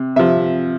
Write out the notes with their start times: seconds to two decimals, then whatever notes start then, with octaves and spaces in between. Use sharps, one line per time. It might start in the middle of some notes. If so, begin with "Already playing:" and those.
Already playing: C3
0.16 C3 F3 E5